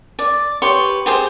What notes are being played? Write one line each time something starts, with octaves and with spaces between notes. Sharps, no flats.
D5
G4 B4 C#5 C6
G4 G#4 C5